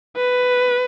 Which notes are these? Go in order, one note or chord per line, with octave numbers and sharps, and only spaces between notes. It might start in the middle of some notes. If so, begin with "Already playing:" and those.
B4